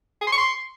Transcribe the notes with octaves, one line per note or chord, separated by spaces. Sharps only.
G#4
C6
C#6
C6